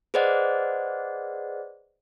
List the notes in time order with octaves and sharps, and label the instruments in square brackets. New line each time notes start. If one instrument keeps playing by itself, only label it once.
[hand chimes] G#4 B4 C5 D5 D#5 F#5